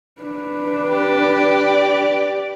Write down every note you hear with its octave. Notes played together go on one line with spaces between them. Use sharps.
D4 B4
G4 D5